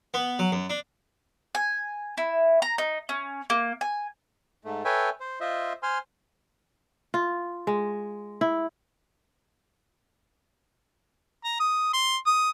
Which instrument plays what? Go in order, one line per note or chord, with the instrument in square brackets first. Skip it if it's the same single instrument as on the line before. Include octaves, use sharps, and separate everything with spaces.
[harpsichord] B3
F#3
F#2
D4
[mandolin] G#5
E4
A#5
D#4
C#4
A#3
G#5
[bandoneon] G#2 A3
A4 B4 C#5 E5 G5 G#5
C5
F4 C5 D#5 E5
C5 G#5 C6 F6
[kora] F4
G#3
E4
[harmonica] A#5
D#6
C6
D#6